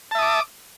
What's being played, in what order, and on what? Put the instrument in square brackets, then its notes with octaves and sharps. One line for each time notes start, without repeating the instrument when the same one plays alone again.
[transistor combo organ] A5
E5
D#6
D6